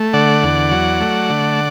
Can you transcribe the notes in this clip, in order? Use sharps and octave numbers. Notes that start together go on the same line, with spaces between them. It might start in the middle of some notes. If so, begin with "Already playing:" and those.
Already playing: A3
D3 D5 F#5
E2
F#3
A3
D3